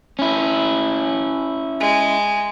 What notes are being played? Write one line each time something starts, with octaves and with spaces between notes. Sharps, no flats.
C#4 E4
G#3